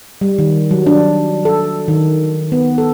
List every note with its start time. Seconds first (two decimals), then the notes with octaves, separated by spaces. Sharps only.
0.21 G3
0.39 D#3
0.71 F#3
0.86 D4
1.45 A4
1.88 D#3
2.52 B3
2.78 A4